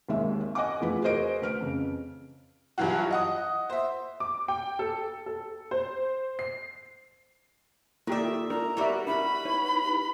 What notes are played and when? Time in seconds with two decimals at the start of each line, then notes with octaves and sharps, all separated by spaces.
0.09 G#1 D#2 G#3 E5
0.55 D#5 F#5 G#5 D6
0.81 E2 F3 A3 E4 B4
1.02 F#4 G#4 A#4 C5 D#5 D7
1.41 D2 B4 F6 D7
1.61 F2 C#3
2.78 G2 E3 F#3 F4 F#4
3.11 D#5 F#5 D#6
3.70 C5 E5
4.20 D6
4.48 G5
4.79 A4
5.26 A4
5.71 C5
6.39 C7
8.07 D#3 A#3 E4 F4 G4 A4 D5 E5
8.50 D4 A#4 A#5
8.77 G3 B3 E4 F#4 G4 A#4 D5 E5
9.07 D4 E4 A#4 E5 B5
9.45 D#4 E4 B4 C#5